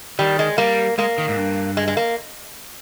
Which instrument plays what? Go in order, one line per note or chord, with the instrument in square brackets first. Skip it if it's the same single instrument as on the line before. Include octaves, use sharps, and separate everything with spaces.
[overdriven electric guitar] D#3 [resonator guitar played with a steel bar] G3
[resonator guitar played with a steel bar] G#3
[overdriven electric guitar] G3 [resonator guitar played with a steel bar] A#3
[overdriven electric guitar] G#3 [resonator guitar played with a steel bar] A#3
[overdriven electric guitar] D#3
G#2
G2
[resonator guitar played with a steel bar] G#3
G#3
A#3